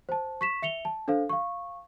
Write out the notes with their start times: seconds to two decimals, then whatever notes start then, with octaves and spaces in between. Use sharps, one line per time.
0.09 C5 A5
0.41 C#6 B6 E7
0.62 E5 C#7 F7 G7
0.85 A5
1.08 D4 A4 C5 F5
1.29 F5 C#6